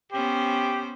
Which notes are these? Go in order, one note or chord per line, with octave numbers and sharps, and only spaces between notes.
B3 C#4 G4 C5